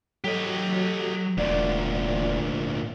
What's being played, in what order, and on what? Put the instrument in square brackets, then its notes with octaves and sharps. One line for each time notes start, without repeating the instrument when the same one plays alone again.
[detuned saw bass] F#3 [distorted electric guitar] G4 D#5 [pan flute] A4
[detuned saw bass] E1 [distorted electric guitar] D2 A#2 [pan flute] D5